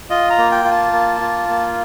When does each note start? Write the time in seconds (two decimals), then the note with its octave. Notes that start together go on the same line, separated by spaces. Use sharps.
0.10 F4 D#5
0.30 A#5
0.38 A#3
0.52 G5
0.64 F4
0.71 A5
0.93 A#3
1.20 F4
1.49 A#3